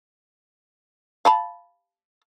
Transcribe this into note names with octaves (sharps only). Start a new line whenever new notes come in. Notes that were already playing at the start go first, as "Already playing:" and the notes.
F5 A5 B5